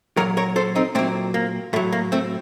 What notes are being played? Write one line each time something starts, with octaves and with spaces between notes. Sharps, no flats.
A#2 F#3 A#4 C#5
A#4 C#5
A4 C5
C4 D#4
A#2 F#3 A3 C4
A#3
A2 F#3 A3
A#3
A3 C4